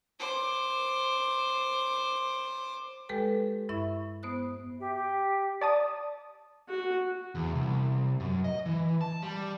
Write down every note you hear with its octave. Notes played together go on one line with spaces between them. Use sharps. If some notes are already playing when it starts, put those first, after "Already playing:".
C5 D6
G#3 G4 A4 B4 G5
G2 E4 E5 C#6
B3 C5 D#6 F#6
G4 E5
G4
D5 A5 D#6
F#4
E2
C2
F#2
D#5
E3
A5
G3